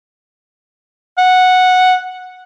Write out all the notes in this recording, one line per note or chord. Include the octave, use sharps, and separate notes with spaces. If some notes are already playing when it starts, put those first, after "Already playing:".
F#5